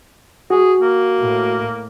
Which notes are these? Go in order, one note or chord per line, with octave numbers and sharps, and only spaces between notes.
F#4 G#4
A#3
A2